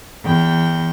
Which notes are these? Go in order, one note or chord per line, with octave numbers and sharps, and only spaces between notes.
E2 G5